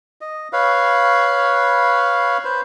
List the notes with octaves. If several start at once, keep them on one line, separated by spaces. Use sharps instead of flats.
D#5
B4 C#5 F5
B4 C5